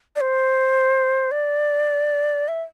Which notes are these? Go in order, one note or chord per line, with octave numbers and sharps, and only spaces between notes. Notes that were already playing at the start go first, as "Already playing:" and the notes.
D5
C5
D5
E5